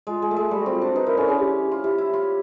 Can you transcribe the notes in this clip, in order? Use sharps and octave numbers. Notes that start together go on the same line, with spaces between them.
G#3 F4
G#3
A3
G#3
G3 G4
C4 F#4
F4
D4 F#4
D#4 B4
E4 A#4
C#4 A4
C#4 G#4
G4
F4
E4 G4
E4
F4